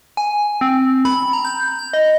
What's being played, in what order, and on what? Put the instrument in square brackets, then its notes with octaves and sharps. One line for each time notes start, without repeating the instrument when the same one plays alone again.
[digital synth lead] G#5
C4
B5
A#5
G6
G6
D#5